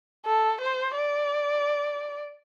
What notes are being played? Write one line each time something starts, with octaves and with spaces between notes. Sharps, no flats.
A4
C5
D5